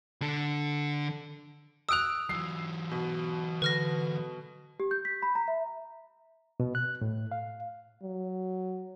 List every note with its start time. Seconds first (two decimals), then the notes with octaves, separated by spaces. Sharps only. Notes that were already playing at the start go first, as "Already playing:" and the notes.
0.21 D3 A4
1.89 D#6 E6 F#6 D7 F7
2.29 E3 F#3 C7
2.91 B2
3.62 D3 B4 F6 A#6
4.80 G4
4.91 G6
5.05 B6
5.22 B5
5.35 A#5
5.48 E5
6.60 B2
6.75 F#6
7.01 A2
7.32 F5
8.03 F#3